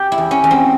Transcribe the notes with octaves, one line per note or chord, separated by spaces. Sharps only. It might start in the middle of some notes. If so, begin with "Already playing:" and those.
Already playing: G4
E4
E2
C#4
E2
C4